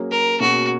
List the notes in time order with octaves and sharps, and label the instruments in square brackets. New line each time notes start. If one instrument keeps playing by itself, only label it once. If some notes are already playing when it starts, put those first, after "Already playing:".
Already playing: [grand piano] F#3 A#3 C#4 G#4 C#5
[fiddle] A#4
[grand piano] B2 A#3 C#4 G#4 [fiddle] F#4